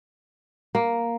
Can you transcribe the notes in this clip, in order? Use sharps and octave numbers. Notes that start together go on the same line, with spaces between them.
A#3